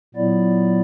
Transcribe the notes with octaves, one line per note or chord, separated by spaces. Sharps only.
A#2 F#3 B3 E4 D5